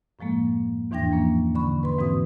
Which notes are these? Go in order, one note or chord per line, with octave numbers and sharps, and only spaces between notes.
F#2 A2 F3 G#3 A#3
E2 G#2 E3 D4 G5 A#6
F3 A#3 C#4
D3 B5 C#6
B4 C6
G#2 E3 C4 F#4 D#6